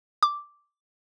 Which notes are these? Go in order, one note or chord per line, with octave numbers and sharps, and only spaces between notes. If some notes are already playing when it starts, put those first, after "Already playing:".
D6